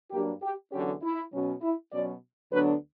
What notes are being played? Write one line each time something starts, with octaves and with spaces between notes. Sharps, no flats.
G2 F#3 A#3 D4 G4
G4
E2 D3 F#3 C#4 G4
E4
B2 F#3 C#4
E4
B2 F#3 C#4 D5
D2 D3 F#3 B3 D4 B4